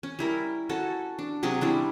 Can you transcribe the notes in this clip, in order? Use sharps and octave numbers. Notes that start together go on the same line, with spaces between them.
C#4
G3 E4 A#4
C#4 F#4 A4
D4
C3 F#3 C#4 G#4
G3 D4 E4